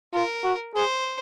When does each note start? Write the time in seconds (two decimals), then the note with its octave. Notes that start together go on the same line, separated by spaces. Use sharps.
0.14 F4 A#4
0.44 F#4
0.75 G#4 C5